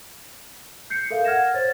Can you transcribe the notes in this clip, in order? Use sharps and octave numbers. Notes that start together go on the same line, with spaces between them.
G6 C7 C#7
A4 A#4 E5 F5
F#5 F6 G#6 A#6 E7
C5 C#5 A6